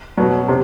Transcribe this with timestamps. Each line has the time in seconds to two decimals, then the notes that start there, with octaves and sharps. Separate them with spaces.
0.17 B2 F#3
0.48 C3